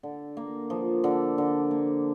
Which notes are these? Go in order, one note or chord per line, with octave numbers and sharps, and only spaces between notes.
D3
A#3
F3
D3
D3
A#3